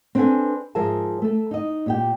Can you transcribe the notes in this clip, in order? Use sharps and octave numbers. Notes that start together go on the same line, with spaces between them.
C4 D4 G#4 A4 B4 G#5
G#2 F3 G#4 A#4 E5 A5
A3 A4
D#4 D#5
A#2 G4 G5